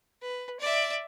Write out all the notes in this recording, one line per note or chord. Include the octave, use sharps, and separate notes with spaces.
B4
D5 E5